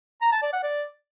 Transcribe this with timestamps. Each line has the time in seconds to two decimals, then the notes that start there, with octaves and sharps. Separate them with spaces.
0.22 A#5
0.32 A5
0.42 D5
0.53 F#5
0.63 D5